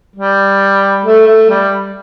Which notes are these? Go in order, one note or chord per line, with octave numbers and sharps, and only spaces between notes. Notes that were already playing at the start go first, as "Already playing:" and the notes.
G3
A3
A3
G3